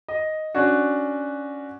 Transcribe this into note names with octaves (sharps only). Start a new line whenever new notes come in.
D#5
C#4 D4 F#4